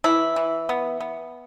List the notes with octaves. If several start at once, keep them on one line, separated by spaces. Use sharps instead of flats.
E3 E4
E3
B3
B3